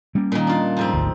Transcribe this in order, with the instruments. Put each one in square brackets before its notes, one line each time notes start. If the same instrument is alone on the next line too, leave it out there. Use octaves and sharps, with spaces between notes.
[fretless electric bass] G3 A#3 C#4
[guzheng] A#2 D#3
D4 F4
F2 G#2 C4
[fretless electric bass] G#1 D2